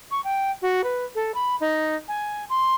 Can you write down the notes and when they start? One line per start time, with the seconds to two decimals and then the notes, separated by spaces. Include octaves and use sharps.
0.11 C#6
0.24 G5
0.62 F#4
0.84 B4
1.15 A4
1.34 B5
1.61 D#4
2.08 G#5
2.50 C6